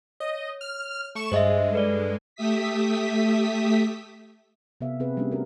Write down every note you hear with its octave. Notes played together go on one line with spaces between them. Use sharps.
C#5 D#5
F6
A3 C#6 E7
G2 G#3 C5 D#5 E5
A4 B4 D5
A3 G4 E5 D#6 B6
C3 B3 E5 F5
C3 C4 G#4 B4
G3 A3 B3 C#4 D4
F#4 A#4